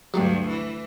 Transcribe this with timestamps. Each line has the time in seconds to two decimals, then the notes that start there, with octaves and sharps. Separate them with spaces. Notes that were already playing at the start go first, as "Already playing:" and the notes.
0.14 D2 G2 F#3 G3 D4
0.49 E3